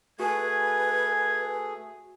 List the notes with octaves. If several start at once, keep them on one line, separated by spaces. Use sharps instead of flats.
A3 F#4 G#4 B4 G#5 G#6